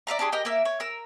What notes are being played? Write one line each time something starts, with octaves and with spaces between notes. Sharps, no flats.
D5 E5 F5 A#5
D4 G4 G#4 C6
G4 A#4 D#5 G5
A#3 A#4 E5
C#5
A#4 E6